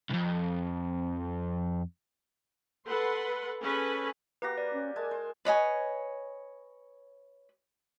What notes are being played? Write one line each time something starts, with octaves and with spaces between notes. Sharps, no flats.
C2 F2
A4 B4 F#5 C6
C#4 G#4 A4 B4 G#5
A#3 F#4 G4 B4 A#6
B4 D5
C#4
G#3 A#4 G#5 A5
C5
B4 C#5 D#5 G#5